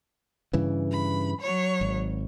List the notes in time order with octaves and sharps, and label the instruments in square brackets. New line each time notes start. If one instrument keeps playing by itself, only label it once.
[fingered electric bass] G2 C#3 E3
[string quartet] B5
F#3 C#5
[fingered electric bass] G#1